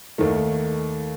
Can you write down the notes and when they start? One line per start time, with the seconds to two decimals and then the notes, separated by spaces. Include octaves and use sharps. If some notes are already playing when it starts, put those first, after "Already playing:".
0.18 D#2 D#3 A3